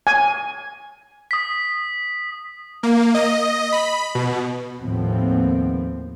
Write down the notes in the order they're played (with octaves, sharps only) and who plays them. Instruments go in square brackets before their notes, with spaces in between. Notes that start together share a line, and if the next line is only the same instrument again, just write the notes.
[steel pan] G#5
[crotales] D#6 B6
[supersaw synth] A#3
D#5
B5
B2
[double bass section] D#2 A2 F3 B3 C4